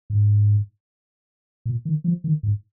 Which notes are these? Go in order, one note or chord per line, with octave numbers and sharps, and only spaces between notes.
G#2
A#2
D#3
F3
D#3
G#2